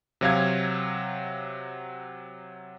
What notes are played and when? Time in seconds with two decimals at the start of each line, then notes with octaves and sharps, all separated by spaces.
0.21 C3 F#3 F5 G#6